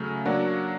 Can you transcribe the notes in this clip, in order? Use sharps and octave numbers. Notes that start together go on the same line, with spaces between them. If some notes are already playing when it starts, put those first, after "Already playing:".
Already playing: C#3 F#3 A3 C#4
F#3 A#3 D4 F#4